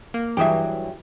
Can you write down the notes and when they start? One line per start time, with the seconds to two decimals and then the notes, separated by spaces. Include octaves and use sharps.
0.14 A#3
0.37 G2 E3 F#3 G4 G#4 E5